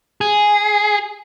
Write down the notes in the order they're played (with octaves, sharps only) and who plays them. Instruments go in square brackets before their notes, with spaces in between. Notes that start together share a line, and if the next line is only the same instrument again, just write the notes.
[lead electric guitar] G#4